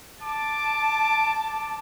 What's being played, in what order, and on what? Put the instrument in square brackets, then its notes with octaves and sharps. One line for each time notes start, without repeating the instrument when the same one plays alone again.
[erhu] A5 [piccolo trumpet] D6